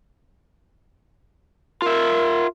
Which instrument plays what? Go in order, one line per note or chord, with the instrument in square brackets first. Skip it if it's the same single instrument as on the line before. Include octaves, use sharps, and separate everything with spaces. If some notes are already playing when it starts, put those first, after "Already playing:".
[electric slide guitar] F4 E5 [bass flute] A#4